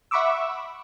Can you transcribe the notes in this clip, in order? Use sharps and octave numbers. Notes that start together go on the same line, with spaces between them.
E5 F#5 B5 C#6 D6 E6